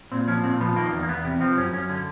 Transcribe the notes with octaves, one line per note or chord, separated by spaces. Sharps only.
A#2 C4
F3 C#4
A#2 C4
F3 B3
D#3 A#3
E2
A#3
E2 B3
C3
F3 C4
F#2 C#4
F#2 C#4
D3 C#4